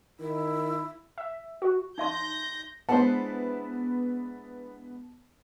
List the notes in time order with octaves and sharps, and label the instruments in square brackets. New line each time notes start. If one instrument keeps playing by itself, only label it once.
[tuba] D#3 [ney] E4
[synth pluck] E5
F#4
[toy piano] D#4 E5 C6 [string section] G6 A#6
[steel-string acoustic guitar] G#3 D4 E4 [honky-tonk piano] B3 [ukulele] C5 F#5 [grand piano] A5